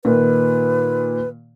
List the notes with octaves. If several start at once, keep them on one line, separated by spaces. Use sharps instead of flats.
A#2 D#3 F4 B4